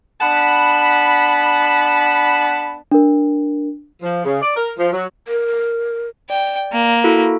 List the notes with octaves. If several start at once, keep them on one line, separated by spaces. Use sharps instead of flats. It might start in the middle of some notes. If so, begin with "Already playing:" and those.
B3 D4 F#5 A5 B5
D4 A#4
F3
C#3
D5
A#4
F3
F#3
A#4
D5 G5
A#3
E4 F#4 A4